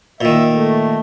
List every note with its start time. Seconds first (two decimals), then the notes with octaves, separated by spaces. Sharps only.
0.21 A#2 D#3 E5
0.51 A3